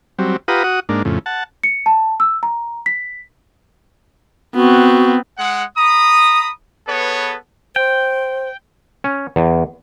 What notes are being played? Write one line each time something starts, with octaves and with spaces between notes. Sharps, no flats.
F#3 G3 C4
F4 G4 B4 F#5 A#5 D#6
F#4 F#5 D#6
G#2 A#3 D4
F2 A2 C#3
F#5 A5
C#7
A5
E6
A#5
B6
B3 C4 F#4
G#3 F#5
A#5 B5 D#6
B3 G#4 A4 B4 C#5
C5 G5
C#4
E2